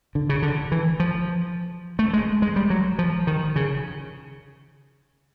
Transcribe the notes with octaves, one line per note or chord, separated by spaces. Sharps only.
D3
C#3
D3
E3
F3
A3
G#3
G#3
G3
F#3
F3
D#3
C#3